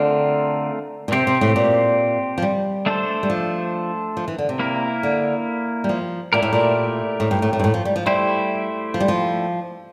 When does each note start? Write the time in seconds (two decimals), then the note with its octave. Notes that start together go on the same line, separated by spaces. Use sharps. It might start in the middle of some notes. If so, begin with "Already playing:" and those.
Already playing: D3 A3 C4 F4 A#4
1.08 A#2
1.12 C3 C4 G4 C5
1.27 C3
1.41 A2
1.56 A#2
2.38 F3
2.42 G3
2.86 A3 D4 A4 C5
3.23 G3
3.30 F3
4.17 F3
4.28 E3
4.38 D3
4.49 C3
4.59 A#3 E4 A#4
5.03 D3
5.84 G3
5.89 F3
6.33 A#2 A3 E4 G4 A#4
6.42 A2
6.53 A#2
7.20 A2
7.31 G2
7.42 A2
7.53 A2
7.60 G2
7.64 A2
7.74 F3
7.85 G3
7.96 F3
8.06 G3 A3 E4 G4 C5
8.94 F3
9.00 G3
9.08 F3